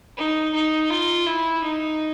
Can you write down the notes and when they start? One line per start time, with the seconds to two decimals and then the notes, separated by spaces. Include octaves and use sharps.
0.17 D#4
0.54 D#4
0.90 F4
1.26 E4
1.63 D#4